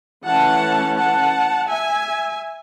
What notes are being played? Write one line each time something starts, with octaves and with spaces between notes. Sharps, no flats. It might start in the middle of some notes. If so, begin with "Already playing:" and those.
E3 A3 C#4 F#5 A5
F#5 A5
E5 G#5